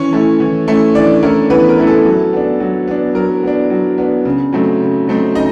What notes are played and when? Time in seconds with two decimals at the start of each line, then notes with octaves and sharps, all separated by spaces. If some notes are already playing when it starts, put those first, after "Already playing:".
Already playing: E3 C#4 C#5
0.13 A3 C#4 E4
0.40 E3
0.68 A3 C#4 E4
0.95 E3 D4 D5
1.23 A3 C#4 E4 A#4
1.50 E3 B3 B4
1.69 A#4
1.78 A3 C#4 E4
1.87 A4
2.05 F#3
2.33 B3 D4
2.60 F#3
2.88 B3 D4
3.15 F#3 A#4
3.43 B3 D4
3.70 F#3
3.98 B3 D4
4.25 C#3
4.53 F#3 A3 C4 D#4
4.80 C#3
5.08 F#3 A3 C4 D#4
5.35 C#3 D#4 D#5